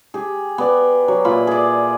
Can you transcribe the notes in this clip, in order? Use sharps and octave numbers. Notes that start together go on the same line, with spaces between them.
G4 G#4
B3 D5
F#3
A#2 E4 F4 B5
G#4 D5